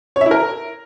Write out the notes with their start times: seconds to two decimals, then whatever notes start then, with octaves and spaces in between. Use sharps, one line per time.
0.16 C#5
0.21 E5
0.26 E4
0.31 A#4